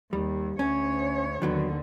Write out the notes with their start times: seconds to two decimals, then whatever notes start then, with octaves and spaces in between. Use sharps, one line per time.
0.13 D#2 G3
0.59 D2 C#4 C#5
1.42 D#2 D3 D#3 F#3 B3